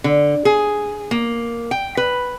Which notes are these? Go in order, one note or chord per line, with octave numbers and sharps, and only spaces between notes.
D3
G#4
A#3
G5
B4